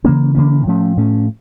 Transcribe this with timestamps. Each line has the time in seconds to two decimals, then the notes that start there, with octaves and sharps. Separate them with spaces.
0.04 C#3 E3 A#3 C#4
0.35 C#3 E3 A#3 C#4
0.65 A2 F3 A3 C#4
0.97 A2 F3 A3 C#4